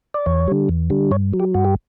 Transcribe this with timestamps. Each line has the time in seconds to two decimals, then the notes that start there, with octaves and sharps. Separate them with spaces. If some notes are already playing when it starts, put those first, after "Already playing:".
0.14 D5
0.26 E2 C#5
0.48 D3 G3
0.69 E2
0.90 D3 G3
1.11 G2 C#5
1.33 F#3
1.40 G4
1.54 G2 F#4
1.65 G4